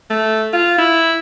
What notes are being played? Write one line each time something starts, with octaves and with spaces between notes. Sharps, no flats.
A3
F4
E4